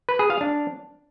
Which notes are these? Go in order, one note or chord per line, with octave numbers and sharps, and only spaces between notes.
B4
G#4
F5
D4